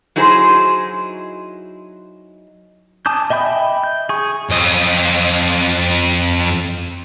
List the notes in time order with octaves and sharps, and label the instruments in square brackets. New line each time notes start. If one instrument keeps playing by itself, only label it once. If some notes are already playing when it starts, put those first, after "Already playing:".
[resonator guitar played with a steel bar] F#3 D#4 E4 G#4 C5
[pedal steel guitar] G#5 A5 D6 D#6 G6
D#5 E5 G5 B5 G6
G6
G#4 C#6
[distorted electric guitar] F2 D#5